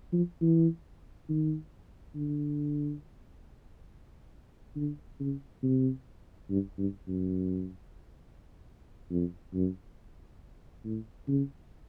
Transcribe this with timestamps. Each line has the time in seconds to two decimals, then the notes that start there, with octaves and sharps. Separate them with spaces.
0.13 F3
0.41 E3
1.29 D#3
2.15 D3
4.76 D3
5.20 C#3
5.63 C3
6.50 G2
6.78 G2
7.08 F#2
9.10 F2
9.54 F#2
10.85 A2
11.28 C#3